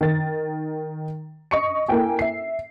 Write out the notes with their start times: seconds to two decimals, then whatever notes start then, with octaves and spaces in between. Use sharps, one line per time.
0.01 D#3 A6
1.51 D#5 C#6 C#7
1.89 A#3 E4 A4 G5 G#5
2.19 E5 C7